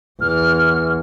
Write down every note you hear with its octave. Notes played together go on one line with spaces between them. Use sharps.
E2 F6